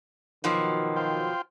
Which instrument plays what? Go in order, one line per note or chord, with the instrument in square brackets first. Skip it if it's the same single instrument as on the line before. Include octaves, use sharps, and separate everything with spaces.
[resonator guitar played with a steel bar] B2 F3 F#3 [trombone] D#3
[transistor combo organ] F4 C5 G5